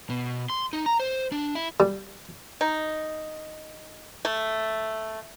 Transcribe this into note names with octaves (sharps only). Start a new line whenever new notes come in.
B2
C6
D#4
A#5
C5
D4
E4
G3
D#4
A3